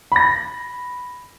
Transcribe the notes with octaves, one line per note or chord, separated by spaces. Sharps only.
B5 A#6